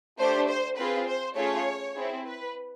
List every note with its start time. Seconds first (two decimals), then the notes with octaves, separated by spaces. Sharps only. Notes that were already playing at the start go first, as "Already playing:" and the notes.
0.19 A3 D4 G4 C5
0.47 C5
0.77 C4 F4 G#4 B4
1.07 C5
1.36 A3 C#4 F4 G#4 C#5
1.95 C4 E4 G#4
2.25 B4